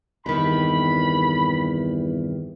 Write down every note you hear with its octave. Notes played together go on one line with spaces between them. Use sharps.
E2 G2 C3 D#3 B5